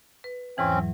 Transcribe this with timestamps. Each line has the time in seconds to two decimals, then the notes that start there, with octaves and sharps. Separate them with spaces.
0.24 B4
0.58 E2 G#2 E3 C4 C#4
0.72 F#3